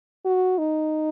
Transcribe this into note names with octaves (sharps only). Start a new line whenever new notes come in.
F#4
D#4